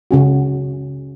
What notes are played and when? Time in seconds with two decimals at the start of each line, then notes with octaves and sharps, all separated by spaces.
0.11 C#3 C#4 F#4